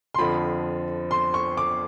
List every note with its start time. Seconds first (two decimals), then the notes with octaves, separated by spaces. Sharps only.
0.15 C6
0.18 F2 D3 F3 B5
1.11 C6
1.34 C#6
1.57 D6